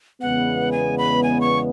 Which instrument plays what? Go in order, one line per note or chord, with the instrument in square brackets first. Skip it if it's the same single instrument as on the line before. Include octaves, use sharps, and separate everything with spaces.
[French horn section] E2 C#3 G#3 B3 [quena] F#5
[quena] G#5
B5
G#5
C#6